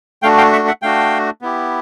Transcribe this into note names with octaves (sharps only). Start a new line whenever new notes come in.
A3 D4 F#4 F5 G5
F5 G5
E5 F#5
E5 F#5
A3 D4 F#4 F5 G5
B3 E4 G4